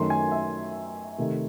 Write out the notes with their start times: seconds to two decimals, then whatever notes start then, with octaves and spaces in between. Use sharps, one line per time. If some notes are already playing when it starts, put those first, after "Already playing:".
Already playing: F#2 D#3 A3 C6
0.10 G#5
0.32 E5
1.18 C3 D#3 A3